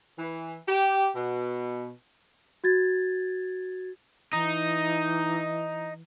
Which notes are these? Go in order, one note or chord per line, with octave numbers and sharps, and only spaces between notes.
E3
G4
B2
F#4 G#6 A6
E3 D#4